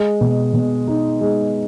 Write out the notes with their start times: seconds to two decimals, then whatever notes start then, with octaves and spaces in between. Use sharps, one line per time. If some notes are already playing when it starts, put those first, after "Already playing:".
Already playing: G#3
0.21 B2
0.53 B2
0.87 D#4
1.21 G#3